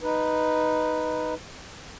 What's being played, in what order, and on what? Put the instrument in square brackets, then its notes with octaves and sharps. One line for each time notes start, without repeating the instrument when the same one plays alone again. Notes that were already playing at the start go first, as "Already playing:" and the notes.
[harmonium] D#4 B4